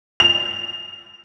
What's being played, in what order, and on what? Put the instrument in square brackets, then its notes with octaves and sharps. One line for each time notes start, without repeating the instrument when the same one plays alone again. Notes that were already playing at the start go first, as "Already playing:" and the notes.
[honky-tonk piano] F7